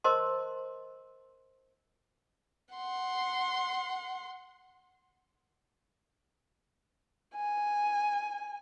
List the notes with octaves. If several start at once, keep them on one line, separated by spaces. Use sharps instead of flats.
A#4 C5 D#5 A5 C6
F#5 C6
G#5